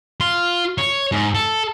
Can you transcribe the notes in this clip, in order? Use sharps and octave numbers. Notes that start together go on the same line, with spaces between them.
F4
C#5
G#2
A4